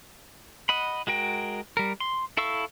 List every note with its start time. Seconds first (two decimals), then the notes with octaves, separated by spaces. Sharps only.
0.69 D#5 F#5 B5
1.07 G#3 F#4 A#4 G5
1.77 G3 A#4
2.00 C6
2.37 E4 A4 F5 C#6 E6